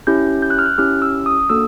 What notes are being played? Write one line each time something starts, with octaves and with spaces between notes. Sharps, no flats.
C#4 E4 G4 G6
G6
F#6
F6
F#6
C#4 E4 G4 F6
E6
D#6
A#3 D4 F#4 A4 E6